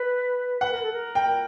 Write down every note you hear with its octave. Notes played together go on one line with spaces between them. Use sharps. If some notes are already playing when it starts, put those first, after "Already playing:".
Already playing: B4
B4 F#5
A#4
A4
A#4
G5